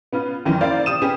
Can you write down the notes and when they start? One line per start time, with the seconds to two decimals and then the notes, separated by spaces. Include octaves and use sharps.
0.13 B3 C#4 F4 B4
0.45 F#2 D#3 E3 C#4
0.61 A#3 C#4 E4 C5 D5 F5
0.86 C3 D#6 E7
1.02 B3 C#4 G4 G#4 C5